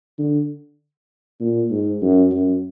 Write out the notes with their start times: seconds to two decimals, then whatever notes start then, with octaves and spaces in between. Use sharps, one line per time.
0.19 D3
1.40 A#2
1.71 G#2
2.02 F#2
2.31 F#2